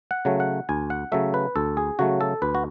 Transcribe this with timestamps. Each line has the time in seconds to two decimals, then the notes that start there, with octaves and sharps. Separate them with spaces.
0.11 F#5
0.25 C#3 F#3 A3
0.40 F#5
0.69 D2 G#5
0.90 F#5
1.12 C#3 F#3 A3 E5
1.34 B4
1.56 D2 A4
1.77 G#4
1.99 C#3 F#3 A3 F#4
2.21 A4
2.42 D2 B4
2.55 F#4